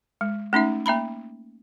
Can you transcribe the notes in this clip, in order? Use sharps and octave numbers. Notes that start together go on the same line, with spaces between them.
G#3
A3 C#4 D#4 E5
A#3 E5 A#5 B5